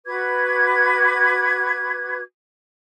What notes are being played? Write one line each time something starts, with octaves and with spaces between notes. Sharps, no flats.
F#4 B4 D6 G#6